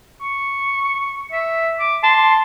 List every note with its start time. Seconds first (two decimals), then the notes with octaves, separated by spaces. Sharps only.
0.21 C#6
1.32 E5
1.79 D6
2.03 A5 C6